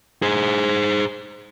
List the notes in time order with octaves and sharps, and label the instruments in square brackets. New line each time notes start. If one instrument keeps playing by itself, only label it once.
[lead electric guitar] G#4 C5